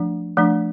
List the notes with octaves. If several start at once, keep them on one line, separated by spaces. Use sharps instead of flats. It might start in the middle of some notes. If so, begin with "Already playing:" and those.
Already playing: F3 A3 D4
F3 A3 D4